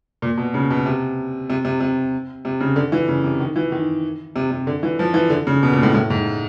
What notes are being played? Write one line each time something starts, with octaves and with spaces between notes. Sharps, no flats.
A#2
B2
C#3
B2
C3
C3
C3
C3
C3
C#3
D3
E3
C#3
C3
D#3
E3
D#3
C3
C3
D3
E3
F3
E3
D3
C#3
B2
A#2
A2
A2
G#2